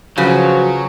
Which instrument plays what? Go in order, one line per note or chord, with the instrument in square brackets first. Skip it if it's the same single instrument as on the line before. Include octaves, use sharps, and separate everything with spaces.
[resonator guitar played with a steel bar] C#3 [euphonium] F3 [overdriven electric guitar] F#3 [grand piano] F#4 B4